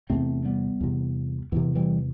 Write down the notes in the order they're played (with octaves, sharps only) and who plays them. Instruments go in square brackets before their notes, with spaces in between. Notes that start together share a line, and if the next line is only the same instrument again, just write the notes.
[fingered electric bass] E2 C3 A3 C4
G3 B3
E2 C3
E2 C3 E3
E3 G3